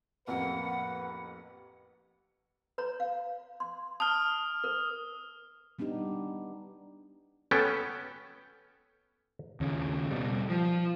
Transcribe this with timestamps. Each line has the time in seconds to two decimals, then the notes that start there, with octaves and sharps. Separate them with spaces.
0.27 A1 F2 A#3 B4 F#5
2.78 B4 C#5 A#5
3.00 F5
3.60 C6
4.00 A5 D#6 F6
4.64 A#4
5.79 G3 B3 D4 D#4 G4
7.51 B3 C#4 A4 G5
9.60 D#2 C#3
10.11 B2 G3
10.49 F3